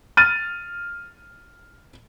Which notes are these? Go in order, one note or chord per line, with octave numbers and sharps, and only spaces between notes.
F6 A6 D#7